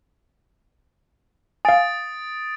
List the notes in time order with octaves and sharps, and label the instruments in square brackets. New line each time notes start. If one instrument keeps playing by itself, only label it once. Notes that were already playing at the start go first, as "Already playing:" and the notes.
[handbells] F5 G#5 [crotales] D#6 A6 D7